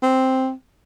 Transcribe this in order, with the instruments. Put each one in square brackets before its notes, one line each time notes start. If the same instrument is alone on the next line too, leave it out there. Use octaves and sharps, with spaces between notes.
[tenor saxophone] C4